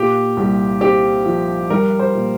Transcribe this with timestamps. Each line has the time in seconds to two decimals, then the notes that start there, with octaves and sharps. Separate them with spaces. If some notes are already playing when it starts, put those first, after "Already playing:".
Already playing: A#2 G4
0.37 C2
0.81 C4 G4
1.25 F3
1.70 G3 A#4
1.99 C5
2.15 A#2